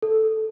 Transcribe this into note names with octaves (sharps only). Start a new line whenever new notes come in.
A4